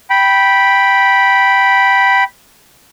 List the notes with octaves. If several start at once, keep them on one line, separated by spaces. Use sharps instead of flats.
G5 B5